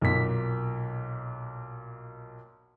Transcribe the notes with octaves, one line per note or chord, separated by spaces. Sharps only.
B1 A#2 B6